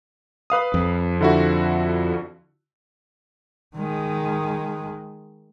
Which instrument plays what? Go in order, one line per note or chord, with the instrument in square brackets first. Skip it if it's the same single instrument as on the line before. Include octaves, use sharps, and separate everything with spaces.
[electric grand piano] B4 F5 D#6
[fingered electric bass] F2
[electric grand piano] D3 E4 F#4
[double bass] D#3 G#3